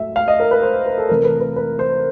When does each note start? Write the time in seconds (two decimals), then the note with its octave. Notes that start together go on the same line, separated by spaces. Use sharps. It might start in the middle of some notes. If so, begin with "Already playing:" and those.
Already playing: A2 F#3 A3 E5
0.16 F5
0.28 D#5
0.40 A#4
0.51 B4
0.62 C5
0.86 B4
0.98 A4
1.09 C3 E3 A3 A#4
1.24 B4
1.40 B4
1.56 B4
1.79 C5